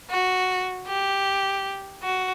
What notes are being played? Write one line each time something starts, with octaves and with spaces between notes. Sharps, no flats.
F#4
G4
F#4